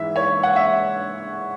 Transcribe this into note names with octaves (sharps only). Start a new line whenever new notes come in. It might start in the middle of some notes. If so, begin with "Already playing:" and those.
Already playing: G#2 E3 E5
C#5
F#5
E5